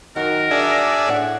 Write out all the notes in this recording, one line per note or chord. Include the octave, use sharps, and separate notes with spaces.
F#2 D#3 A#4 F#5
D4 G#4 D5 E5
A2 F#5